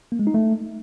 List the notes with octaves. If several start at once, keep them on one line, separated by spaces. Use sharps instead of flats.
A#3
G#3
D#4
A3